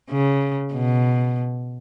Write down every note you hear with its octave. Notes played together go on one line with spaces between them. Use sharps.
C#3
B2